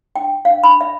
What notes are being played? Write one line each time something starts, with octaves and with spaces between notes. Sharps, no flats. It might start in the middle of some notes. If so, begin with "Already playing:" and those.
G5
F5
B5
E5